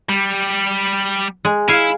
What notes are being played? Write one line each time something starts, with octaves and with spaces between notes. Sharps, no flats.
G3
G#3
E4 F5 G#5